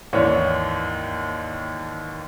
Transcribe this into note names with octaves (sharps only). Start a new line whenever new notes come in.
D#2 G#2 E3 D4 C#5